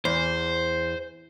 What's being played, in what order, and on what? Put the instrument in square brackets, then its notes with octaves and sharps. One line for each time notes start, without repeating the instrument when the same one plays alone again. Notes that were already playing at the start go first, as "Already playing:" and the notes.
[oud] E2 [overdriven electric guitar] C5